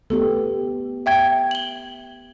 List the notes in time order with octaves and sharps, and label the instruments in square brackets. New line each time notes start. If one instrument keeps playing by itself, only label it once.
[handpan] A3 B3 G4 [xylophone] A4
[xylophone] E5 G5 G#6
F#7 G7